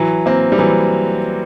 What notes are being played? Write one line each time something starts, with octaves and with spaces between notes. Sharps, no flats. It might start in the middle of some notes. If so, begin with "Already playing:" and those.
Already playing: E3 F#3
A#3 C4
G3
E3 F#3